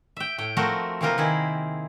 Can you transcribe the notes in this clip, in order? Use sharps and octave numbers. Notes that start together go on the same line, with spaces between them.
E5 G5
A2 G5
F3 A3 C4 F#4 A#4
C3 E3 A#3 C4 F4 A#4
D#3 E4 G#4